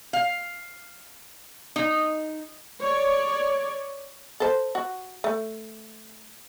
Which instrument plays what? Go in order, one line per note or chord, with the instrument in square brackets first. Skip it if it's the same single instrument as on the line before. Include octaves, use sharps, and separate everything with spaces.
[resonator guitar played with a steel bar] F5
D#4
[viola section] C#5 D5
[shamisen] A4 C5
F#4
A3